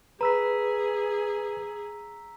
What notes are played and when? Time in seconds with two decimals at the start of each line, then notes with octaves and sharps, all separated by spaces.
0.21 G#4 B4 A#5 E6 B6